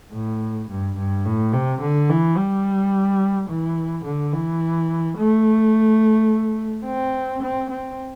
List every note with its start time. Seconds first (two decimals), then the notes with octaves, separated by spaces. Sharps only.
0.13 A2
0.69 G2
0.97 G2
1.25 A2
1.53 C3
1.81 D3
2.09 E3
2.37 G3
3.49 E3
4.05 D3
4.33 E3
5.17 A3
6.86 C4
7.42 C4
7.70 C4